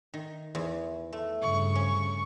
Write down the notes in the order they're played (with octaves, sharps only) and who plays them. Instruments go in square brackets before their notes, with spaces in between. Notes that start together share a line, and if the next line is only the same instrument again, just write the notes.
[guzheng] D#3
E2
A3
[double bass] G2 C#3 [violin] C#6
[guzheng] C#4